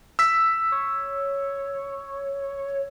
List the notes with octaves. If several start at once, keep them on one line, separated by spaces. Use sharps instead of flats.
E6 B6
C#5